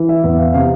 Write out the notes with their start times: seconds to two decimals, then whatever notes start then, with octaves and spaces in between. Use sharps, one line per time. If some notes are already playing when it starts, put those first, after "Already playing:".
Already playing: E3
0.09 E5
0.24 E2 E5
0.39 F5
0.54 C3 F5